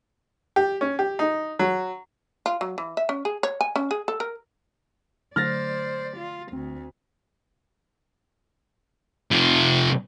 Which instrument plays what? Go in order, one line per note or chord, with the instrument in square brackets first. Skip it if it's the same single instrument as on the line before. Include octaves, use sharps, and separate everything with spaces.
[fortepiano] G4
C#4
G4
D#4
F#3
[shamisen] F4
F#3
E3
E5
C#4
G#4
C#5
G#5
C#4
G#4
A4
A#4
[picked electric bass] D3 F#3 A3 [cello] C5 D5 [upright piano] F6 A6 A#6
[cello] F4
[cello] D2 [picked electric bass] C4
[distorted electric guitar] C3 F3